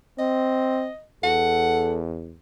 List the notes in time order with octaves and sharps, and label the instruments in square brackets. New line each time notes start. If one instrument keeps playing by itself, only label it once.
[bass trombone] C4 [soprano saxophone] D#5
[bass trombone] E2 [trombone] A4 [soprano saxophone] F#5